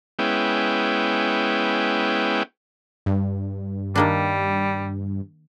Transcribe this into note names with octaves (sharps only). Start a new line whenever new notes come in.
G#3 B3 C#4 E4 G5
G2
D#3 G3 A#3 D4